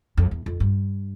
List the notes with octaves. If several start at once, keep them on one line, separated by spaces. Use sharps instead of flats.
F2
E2
F2
G2